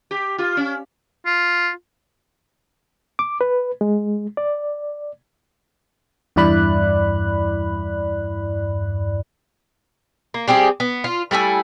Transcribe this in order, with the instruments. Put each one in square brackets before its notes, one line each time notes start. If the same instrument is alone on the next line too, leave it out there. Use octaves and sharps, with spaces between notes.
[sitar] G4
F4
C#4
[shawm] F4
[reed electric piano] D6
B4
G#3
D5
[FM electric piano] E2 G2 E4 D5 B5 F#6
[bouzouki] A#3
G3 C4 G4 G#4
B3
F4
G3 A3 E4 G#5